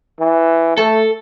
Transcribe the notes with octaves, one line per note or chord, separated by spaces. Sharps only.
E3
A3 A4